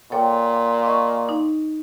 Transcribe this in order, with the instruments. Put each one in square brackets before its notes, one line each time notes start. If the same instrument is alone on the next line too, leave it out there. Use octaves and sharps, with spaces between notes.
[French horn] A#2 [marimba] A4 C#5 G5
[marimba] D#5 C#6
D#4